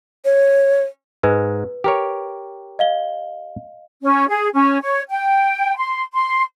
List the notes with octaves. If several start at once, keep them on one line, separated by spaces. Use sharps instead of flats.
C#5
G#2 G#3 B4
G4 A#4 C#5
D#5 F5 G7
C#4
G#4
C#4
C#5
G5
C6
C6